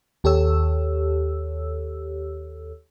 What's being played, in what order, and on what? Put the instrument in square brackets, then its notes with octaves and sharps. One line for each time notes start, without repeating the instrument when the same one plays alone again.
[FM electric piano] D#2 G4 A4 C#5 E6